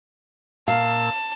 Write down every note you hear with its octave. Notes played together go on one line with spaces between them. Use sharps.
A#2 F5 A5 E6